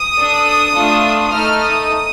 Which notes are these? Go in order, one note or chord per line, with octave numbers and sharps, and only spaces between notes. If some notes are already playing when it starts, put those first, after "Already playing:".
Already playing: D#6
D4 A4
A3 D4 F4 A4
A3 D#4 A4 F6
D#6